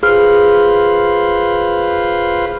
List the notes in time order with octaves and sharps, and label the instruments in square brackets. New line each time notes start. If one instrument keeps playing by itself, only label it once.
[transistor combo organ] F4 B4 C5 [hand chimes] G#4 F6